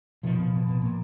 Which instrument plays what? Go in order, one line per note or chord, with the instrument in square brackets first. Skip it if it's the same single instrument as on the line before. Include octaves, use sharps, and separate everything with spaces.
[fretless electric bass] B2 D#3 F3
B2
B2
B2
A#2